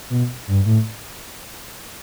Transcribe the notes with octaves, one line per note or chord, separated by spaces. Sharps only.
B2
G2
A2